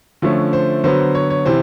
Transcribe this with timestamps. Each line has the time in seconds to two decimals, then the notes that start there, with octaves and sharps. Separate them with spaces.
0.22 D3 F3 A3 C#4
0.53 C5
0.84 D3 F#3 B3 C5
1.15 C#5
1.30 C#5
1.46 C3 E3 C5